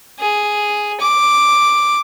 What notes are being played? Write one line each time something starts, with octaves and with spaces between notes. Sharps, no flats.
G#4
D6